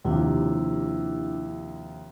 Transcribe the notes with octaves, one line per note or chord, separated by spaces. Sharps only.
D#2 C3 F3 D4 E4 E6